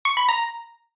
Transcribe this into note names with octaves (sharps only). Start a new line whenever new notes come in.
C#6
B5
A#5